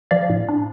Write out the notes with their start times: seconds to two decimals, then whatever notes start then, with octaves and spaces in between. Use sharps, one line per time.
0.11 F3 D5 F5
0.30 A2
0.49 D4